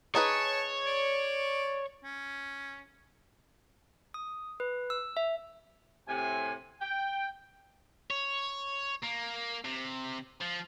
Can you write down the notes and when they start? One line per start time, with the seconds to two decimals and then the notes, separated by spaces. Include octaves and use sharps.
0.15 D#4 G#4 B4 C#5 A5
0.86 D5
2.04 C#4
4.14 D#6
4.60 B4
4.90 E6
5.17 E5
6.08 A2 C3 G#5
6.81 G5
8.10 C#5
9.03 A#3
9.65 C3
10.41 F3